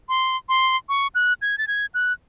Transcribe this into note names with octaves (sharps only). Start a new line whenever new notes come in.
C6
C6
C#6
F#6
G#6
A6
G#6
F#6